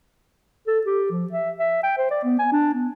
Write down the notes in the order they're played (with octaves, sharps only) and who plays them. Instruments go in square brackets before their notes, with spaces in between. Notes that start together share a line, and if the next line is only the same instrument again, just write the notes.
[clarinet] A4
G4
F3
E5
E5
G5
C5
D5
B3
G#5
D4
B3